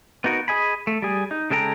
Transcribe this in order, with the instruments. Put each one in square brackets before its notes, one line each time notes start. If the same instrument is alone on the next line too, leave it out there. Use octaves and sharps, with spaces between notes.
[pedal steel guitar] B3 D#4 F#4 A#4
G#4 D#5 G#5 B5
A3
G3 G#4
D#4
C#3 G#3 A4 G5 A#5